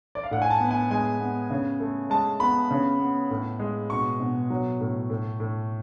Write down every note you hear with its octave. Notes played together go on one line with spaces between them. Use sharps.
D5
F5
A2 F#5
G#5
A5
B3
G#5
G#3 G#5
B3
C#3
A3
G#3 A5
B3 B5
C#3
B3
A2
G#3
B2 C#6
B2
F#3
A2
A2
A2